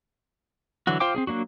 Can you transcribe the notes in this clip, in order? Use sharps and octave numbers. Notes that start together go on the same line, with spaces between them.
D3 E3 F#3 F#4
F4 C5 F5 G5 D6
C4 D4 G#4
F#3 A#3 D4 F#4